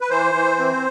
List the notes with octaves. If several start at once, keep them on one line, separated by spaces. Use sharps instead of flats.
B4
E3 C5
E3
C4